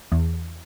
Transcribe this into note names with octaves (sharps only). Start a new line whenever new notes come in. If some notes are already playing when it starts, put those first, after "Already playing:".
E2